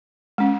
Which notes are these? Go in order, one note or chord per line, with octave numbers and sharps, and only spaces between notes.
G#3 C#4